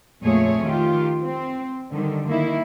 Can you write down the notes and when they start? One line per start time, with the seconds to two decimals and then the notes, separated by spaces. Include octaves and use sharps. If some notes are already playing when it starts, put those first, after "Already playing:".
0.22 F2 A#2 A3 G#4 C#5
0.64 D#3 F4 G4
1.22 C4
1.91 D3 D#3 G3
2.26 D#3 A#3 E4